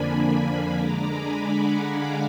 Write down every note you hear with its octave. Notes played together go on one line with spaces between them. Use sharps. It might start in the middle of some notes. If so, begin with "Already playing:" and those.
Already playing: F2 D3 F3 A#3 D4 G#5 B5
G#5 B5
D3 G#3 D4 A#5 D6
G#5 B5
F#5 A#5
F5 G#5